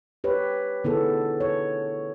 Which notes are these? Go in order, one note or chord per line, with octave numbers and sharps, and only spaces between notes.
G4 B4 C#5
D3 B3 D#4 E4 G#4 A4
C#5